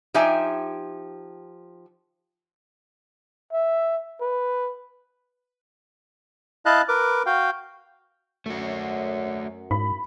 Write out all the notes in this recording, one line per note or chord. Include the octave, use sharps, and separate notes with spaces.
F3 D#4 G4 E5 G5 G#5
E5
B4
E4 D#5 F5 A5 F#6
A#4 B4 D6
F#4 F5 G5
F#2 A3 F#4
G#2 B5